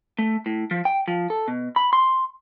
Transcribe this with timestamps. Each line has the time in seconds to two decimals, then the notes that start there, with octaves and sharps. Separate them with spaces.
0.19 A3
0.46 A2
0.71 F3
0.85 G5
1.08 F3
1.30 A4
1.48 B2
1.76 B5
1.93 C6